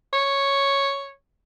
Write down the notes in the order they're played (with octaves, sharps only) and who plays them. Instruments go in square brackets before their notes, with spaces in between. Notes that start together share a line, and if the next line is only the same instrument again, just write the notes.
[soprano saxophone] C#5